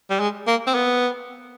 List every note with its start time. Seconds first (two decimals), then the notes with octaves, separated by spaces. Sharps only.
0.10 G3
0.20 G#3
0.47 A#3
0.67 C4
0.75 B3